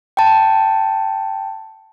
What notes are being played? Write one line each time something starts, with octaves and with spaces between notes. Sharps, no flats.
G5 A5